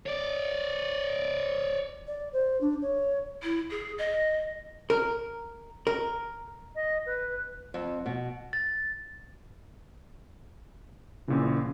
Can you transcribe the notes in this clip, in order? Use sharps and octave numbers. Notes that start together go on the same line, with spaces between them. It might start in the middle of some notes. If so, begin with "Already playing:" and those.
C#5 D5
D5
C5
D4
C#5
E4
G#4
D#5
A#4
A#4
D#5
B4
F2
B2
A6
A#1 A#2 C#3 E3